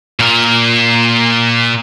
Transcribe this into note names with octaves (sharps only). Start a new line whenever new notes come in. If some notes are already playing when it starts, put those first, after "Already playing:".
A#2 A#4